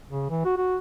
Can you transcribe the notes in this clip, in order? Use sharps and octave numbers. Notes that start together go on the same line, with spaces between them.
C#3
E3
F#4
F#4